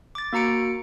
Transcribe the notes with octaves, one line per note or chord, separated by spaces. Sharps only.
D6 A6
A#3 F#4 A#5 C#7 D7